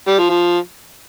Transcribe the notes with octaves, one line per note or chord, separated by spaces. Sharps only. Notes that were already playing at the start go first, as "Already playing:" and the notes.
G3
F3
F3